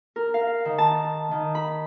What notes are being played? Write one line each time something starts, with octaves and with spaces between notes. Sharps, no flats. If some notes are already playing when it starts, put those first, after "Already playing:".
A#4
F5
D#3
A5
D#3
B5